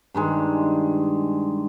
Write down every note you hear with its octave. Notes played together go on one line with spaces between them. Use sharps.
G2 D#3 G#3